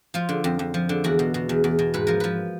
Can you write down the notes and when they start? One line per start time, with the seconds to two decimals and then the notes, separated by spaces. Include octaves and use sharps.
0.14 F3 F4
0.29 D3
0.44 F2
0.59 F2
0.74 F3
0.89 D3
1.04 E2 F#4
1.19 B2
1.34 B2
1.49 E2
1.64 E2
1.79 B2
1.94 G#2 B4
2.07 F3 A#4
2.20 F3 B4